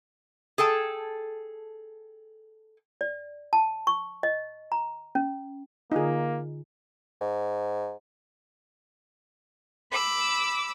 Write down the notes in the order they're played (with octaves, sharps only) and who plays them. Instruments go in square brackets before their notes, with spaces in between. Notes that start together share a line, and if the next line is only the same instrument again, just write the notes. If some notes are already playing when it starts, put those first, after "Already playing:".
[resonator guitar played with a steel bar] G#4 A4 G5 A5
[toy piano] D5
A5
C#6
D#5
A#5
C#4
[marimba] D3 F4 [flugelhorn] A#3 [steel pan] D#4 G#4
[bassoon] G#2
[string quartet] B5 D6 E6